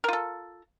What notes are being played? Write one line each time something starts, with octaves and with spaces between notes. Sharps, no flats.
F4 A4 A#4